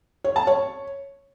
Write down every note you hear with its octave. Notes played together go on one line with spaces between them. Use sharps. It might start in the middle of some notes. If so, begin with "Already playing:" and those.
C#5
A5
C#5